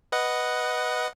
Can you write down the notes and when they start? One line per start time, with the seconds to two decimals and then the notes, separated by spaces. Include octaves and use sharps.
0.12 B4 D#5 F#5